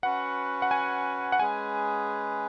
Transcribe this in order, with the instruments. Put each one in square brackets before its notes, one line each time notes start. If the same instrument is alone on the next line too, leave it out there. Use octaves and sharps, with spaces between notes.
[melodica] C#4 F#4 B4 [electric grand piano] F#5
[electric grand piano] F#5
G#5
F#5
[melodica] G#3 C#4 G#4 B4 [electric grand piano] G#5